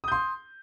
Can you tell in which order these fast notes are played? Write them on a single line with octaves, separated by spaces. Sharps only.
D#6 G6 C6